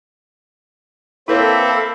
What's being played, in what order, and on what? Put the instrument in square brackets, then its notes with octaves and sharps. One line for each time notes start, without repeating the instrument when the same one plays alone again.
[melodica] A#3 E5 B5 [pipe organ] C4 [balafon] E4 B4 C#5 [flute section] A4